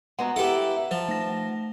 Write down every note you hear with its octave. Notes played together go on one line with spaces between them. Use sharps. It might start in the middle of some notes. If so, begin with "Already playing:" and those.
G#3 B3 F#4 F#5 A#5
E4 G4 A4 B4
F3 C5 A5
A3 A#6